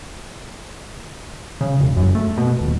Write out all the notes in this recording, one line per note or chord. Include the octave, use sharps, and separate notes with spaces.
C#3
E1
F#2
A3
B2
D#1